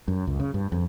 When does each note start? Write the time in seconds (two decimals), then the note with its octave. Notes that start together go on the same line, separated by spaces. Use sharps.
0.08 F#2
0.27 C#2
0.40 C#3
0.54 G2
0.72 F2